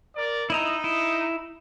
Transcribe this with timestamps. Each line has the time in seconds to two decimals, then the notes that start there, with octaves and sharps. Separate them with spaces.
0.14 A#4 D5
0.50 D#4 E4 D#5 A#5
0.84 E4